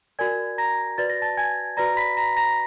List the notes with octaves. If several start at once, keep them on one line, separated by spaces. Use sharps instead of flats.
F#4 A#4 D5 G#5 G#6
A#5 A#6
F#4 B4 D5 A6
A#6
A5 A6
G#5 G#6
F#4 B4 D5 A#5 A#6
B5 B6
A#5 A#6
A#5 A#6